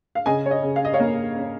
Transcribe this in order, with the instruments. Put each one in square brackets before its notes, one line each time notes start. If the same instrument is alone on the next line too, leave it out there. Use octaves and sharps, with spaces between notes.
[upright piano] F5
C#3 D#5 G#5
C#5
D#5
C#3
F5
D#5
C#5 F5
A#3
C#4